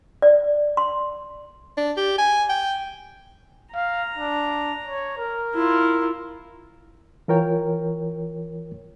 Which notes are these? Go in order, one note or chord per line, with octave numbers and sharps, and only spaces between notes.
D5
C6
D4
G4
G#5
G5
F5 A#5
D4
C#5
A#4
E4 F4
E3 F4 A#4 C#5 G5